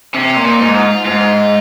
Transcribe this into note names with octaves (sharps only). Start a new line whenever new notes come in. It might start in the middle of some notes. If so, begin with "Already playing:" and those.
C3 C#4
A#2
D#4
G#2
F4
G#2 F4